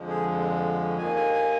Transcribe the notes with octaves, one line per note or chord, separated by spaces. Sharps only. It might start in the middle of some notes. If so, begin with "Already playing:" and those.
Already playing: F2 D3 F3 G#3
G#4
D#2 D#3 A#3 G#5
G#5
G#5